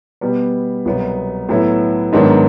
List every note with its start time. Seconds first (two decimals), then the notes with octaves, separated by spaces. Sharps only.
0.21 B2 G3 B3
0.85 C2 B2 F#3 B3
1.49 A2 F#3 B3 E4
2.13 G#2 D#3 F#3 B3 D4